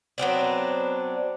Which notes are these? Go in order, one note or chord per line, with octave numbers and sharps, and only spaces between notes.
F#3 B3 C4 D4